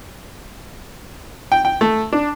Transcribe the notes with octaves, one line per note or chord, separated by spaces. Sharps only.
G5
G5
A3
D4